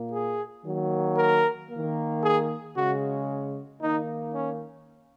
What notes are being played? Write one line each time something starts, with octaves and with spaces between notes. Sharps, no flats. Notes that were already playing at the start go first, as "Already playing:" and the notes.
Already playing: A#2 A#3
G#4
D#3 F#3 A#3
A#4
D#3 A#3
G#4
C#3 G#3 F#4
D#3 A#3 D#4
C#4